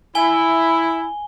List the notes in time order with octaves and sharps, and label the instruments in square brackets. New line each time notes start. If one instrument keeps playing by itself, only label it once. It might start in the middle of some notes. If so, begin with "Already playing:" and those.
[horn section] E4 [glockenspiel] G#5 G7